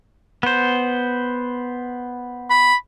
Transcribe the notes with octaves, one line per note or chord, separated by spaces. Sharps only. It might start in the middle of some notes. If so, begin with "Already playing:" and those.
B3 C5
B5